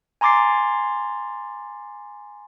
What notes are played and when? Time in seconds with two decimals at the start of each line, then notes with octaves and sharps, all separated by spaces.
0.21 G#5 A#5 C6 D6 A6 C7